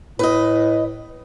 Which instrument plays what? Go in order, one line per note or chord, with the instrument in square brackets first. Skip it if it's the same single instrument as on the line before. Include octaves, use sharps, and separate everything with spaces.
[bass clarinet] A2 [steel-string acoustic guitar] B4 D#5